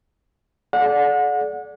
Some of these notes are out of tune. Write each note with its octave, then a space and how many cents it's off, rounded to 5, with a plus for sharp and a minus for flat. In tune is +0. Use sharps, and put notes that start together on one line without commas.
A4 -45 D5 -10 F#5 -35